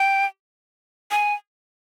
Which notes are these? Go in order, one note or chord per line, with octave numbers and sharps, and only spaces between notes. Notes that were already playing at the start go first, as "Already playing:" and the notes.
Already playing: G5
G#5